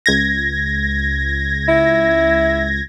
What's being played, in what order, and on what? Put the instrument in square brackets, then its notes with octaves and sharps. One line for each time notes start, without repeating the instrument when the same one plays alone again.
[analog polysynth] C#2 G#6 A#6
[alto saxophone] E4